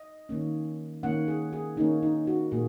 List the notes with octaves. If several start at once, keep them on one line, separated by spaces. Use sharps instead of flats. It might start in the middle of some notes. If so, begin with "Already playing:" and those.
Already playing: D#5
D#3 A#3 C#4
D#3 A#3 C#4 F#5
G#4
G#4
D#3 A#3 C#4 D#4
D#4
F#4
A#2 A#3 G#4